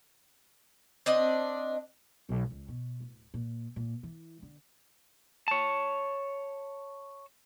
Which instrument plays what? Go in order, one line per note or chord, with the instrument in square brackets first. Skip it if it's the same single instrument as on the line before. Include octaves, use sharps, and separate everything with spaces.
[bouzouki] C4 D4 D#5
[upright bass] B1
C#2
B2
D1
A#2
A#2
E3
D3
[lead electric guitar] C#5 A5